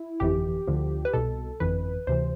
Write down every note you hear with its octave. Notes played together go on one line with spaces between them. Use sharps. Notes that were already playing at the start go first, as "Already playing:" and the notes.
Already playing: E4
G1 F2 E3 G4
D2 D3 F3
B4
C2 B2 A4
G1 F2 E3 B4
D2 C3 E3 C5